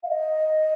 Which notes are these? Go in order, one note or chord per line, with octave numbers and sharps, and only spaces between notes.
F5
D#5